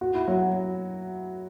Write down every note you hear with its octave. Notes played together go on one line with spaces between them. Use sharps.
F#4
E4
F#3 F#4